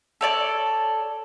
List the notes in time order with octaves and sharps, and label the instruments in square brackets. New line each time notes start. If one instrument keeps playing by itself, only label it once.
[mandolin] A4 C#5 D5